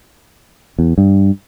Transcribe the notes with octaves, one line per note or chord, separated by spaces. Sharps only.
E2
G2